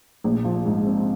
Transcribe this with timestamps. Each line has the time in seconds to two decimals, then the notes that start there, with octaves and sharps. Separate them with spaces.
0.24 A#1
0.45 F3
0.66 G#2
0.86 C4